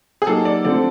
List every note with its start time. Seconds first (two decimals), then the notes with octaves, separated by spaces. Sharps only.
0.22 G#4
0.27 F#3 A#3 D#4 G4 A4
0.45 D5
0.65 D3 F3 A3 C4 D5